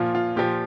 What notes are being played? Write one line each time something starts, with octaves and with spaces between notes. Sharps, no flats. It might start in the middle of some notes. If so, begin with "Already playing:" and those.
Already playing: A#2 F3 F4
F4
A#2 F3 G4